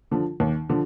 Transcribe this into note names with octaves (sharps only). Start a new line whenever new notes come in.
D3 F3
D#2
D3 F3